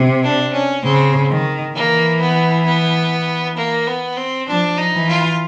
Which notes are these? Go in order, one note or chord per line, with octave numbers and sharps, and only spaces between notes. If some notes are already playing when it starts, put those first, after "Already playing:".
Already playing: C3
D4
C#4
C#3 C4
D#3
E3 A#3
B3
B3
A#3
B3
C4
F3 D4
D#4
E3
F4